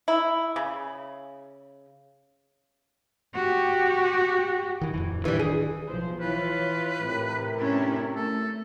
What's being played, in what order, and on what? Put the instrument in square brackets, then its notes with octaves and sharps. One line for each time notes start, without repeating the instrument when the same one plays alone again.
[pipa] E4
C#3
[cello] F#4 G4
[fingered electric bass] D#3 E3
D1 F2 E3
[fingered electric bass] D1 D#3 D4 [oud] E3 G3
[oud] G#4
[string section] B1 F3 C5
[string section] E3 F4 C#5 [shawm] B4
[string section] A2 C3 A#4
[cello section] C#4 D4 E4
[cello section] A3 [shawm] A4